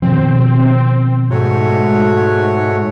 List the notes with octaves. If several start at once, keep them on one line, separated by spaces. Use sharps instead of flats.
B2 D#3 F3 C4
G#2 A3 F#4 C#5